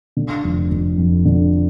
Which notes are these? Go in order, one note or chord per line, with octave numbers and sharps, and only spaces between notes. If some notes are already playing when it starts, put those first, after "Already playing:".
D3
F1
F1
F2
D3